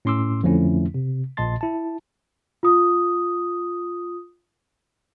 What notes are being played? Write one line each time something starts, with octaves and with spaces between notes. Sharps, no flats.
A2 C#4 C6 D6 E6
F2 D3 F3 A3 C#4 E4
C3
A#1 A#2 D#5 A5 C6 A6
E4 A5
F4 D#6